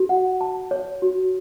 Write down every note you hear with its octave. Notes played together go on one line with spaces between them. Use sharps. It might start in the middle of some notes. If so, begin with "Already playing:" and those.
Already playing: F#4
F#5
A5
C#5
F#4